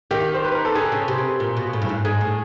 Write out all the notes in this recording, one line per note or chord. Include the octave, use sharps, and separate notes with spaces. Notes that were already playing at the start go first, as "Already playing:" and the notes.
D#3 G4
C5
B4
A#4
A4
D3 G#4
C#3
C3
A#2
B2
A2
G2
G#2
G#2 G#4
A2